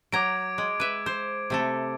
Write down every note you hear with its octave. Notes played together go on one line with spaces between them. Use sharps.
F#3 A#5 D6 G#6 D7
G#3
B4 E5
C5
C3 A3 A4